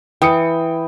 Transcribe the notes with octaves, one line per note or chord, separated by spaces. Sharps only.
E3 G5 D#6 C#7